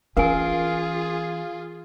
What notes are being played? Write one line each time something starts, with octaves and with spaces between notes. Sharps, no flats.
E3 C#4 F4 G#4 A#4 F5 G#5